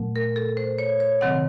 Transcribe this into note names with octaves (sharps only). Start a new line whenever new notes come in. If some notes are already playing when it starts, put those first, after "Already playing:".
Already playing: A#2 F#3 A3
A#4
A4
C5
C#5
C#5
C3 D#3 F#3 C4 F#5